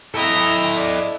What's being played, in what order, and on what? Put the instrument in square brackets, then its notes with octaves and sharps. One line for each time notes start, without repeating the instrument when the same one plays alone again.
[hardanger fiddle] E4 [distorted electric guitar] A4 D#5 [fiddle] G5 A#5
[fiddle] D5